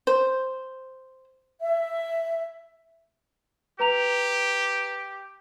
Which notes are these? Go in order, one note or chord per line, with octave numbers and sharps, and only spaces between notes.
C5
E5
G4 B4 A#5 F7